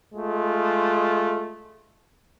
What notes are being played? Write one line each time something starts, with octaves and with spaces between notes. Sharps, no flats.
G#3 A3 F4